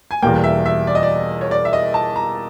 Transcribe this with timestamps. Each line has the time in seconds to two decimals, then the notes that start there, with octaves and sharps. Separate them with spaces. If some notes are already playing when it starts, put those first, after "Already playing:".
0.11 G#5
0.22 E2 B2 G3 A#3 G5
0.44 E5
0.66 E5
0.87 D5
0.95 D#5
1.03 D5
1.41 C#5
1.51 D5
1.65 E5
1.73 D#5
1.94 A5
2.16 A#5